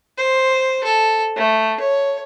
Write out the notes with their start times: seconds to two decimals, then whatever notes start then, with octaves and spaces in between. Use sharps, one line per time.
0.18 C5
0.84 A4
1.36 A3
1.80 C#5